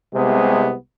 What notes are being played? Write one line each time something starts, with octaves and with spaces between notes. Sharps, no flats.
C2 C3 G#3 B3